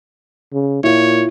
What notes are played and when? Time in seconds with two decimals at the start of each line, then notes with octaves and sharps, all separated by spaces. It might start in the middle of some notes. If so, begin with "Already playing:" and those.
0.53 C#3
0.84 A#2 E4 F4 C#5